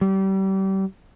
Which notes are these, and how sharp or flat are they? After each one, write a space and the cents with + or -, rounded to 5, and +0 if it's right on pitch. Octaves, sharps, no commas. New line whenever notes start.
G3 -30